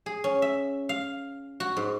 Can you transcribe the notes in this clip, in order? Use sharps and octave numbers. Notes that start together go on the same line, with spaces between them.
G#4
C#4
E5
F5
F#4
G#2